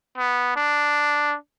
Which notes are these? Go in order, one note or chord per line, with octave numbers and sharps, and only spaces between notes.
B3
D4